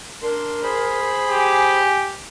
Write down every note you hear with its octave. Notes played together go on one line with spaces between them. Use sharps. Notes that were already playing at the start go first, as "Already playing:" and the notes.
D4 A#4 C6
G#4 C5 B5
G4 G#5